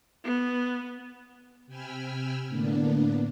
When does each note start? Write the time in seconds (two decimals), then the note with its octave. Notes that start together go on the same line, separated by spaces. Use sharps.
0.24 B3
1.67 C3 G5 G#5 B5 E6 F6
2.49 A2 D3 A#3 B3 D4